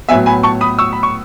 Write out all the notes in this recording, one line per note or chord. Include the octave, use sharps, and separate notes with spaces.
A2 F#3 B3 E5 G#5
G#5 B5
A5 C#6
B5 D#6
C#6 E6
B5
C#6